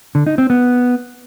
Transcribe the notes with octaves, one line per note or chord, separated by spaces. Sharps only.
D3
D#4
C4
B3